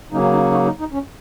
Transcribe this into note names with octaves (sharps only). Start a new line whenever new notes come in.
C#3 F#3 A#3 C#4 D#4
C#4
D#4
D#4 F#4
D#4
D#4
C#4